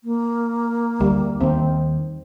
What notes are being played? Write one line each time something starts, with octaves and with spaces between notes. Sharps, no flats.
A#3
D2 G3
D#2 D#3 C4